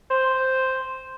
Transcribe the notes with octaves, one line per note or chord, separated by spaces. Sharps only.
C5